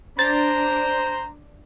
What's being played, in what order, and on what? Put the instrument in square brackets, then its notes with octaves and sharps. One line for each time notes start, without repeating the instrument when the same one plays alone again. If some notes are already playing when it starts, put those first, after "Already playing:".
[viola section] D4 [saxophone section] C5 [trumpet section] A#5 [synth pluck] A6